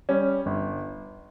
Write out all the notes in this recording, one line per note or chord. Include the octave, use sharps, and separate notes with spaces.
G3 C#4
G1